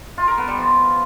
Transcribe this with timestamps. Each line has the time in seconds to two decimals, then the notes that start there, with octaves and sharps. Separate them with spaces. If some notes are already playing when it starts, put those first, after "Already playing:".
0.18 F4
0.28 A#4
0.38 B3
0.48 G3
0.58 F3